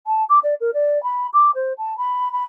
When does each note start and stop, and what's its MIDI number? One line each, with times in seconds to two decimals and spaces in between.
0.06 0.23 81
0.29 0.39 86
0.43 0.54 74
0.60 0.70 70
0.73 1.01 74
1.03 1.27 83
1.33 1.51 86
1.54 1.73 72
1.78 1.93 81
1.97 2.31 83
2.32 2.43 83